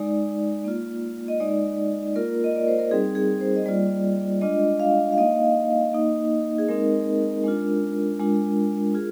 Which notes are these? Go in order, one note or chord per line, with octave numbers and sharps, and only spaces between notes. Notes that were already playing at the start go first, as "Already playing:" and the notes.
Already playing: G#3 D#4 D5
A#3 F4
D#5
G#3 D#4 D5
A#3 F4 A#4
D#5
D5
C5
A#4
G3 C4 D#4 G#4
G#4
C5
D#5
G3 A#3 F4 D5
G#3 D4 F4 D#5
F5
F5
A#3 D#4 D#5
A#3 D#4
G#4
G#3 C4 D#4 A#4
G#3 D4 F4
G#3 D4 F4
F4 G#4